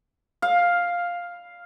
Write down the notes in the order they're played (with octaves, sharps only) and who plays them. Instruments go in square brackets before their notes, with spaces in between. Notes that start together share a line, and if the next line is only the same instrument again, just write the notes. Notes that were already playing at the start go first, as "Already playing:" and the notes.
[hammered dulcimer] F5